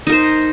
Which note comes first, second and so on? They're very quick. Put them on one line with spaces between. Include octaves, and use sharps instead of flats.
D#4 A#4 C5